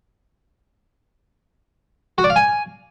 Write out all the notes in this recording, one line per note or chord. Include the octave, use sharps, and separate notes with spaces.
F#4
D5
F5
G#5